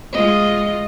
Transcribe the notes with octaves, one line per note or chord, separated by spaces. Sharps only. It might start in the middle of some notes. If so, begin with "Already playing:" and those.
G#3 F4 D#5